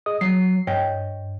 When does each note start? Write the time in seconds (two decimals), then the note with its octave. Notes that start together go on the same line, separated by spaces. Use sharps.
0.06 G#4 D#5 D#6
0.21 F#3 C7
0.67 G2 C#5 D#5 G5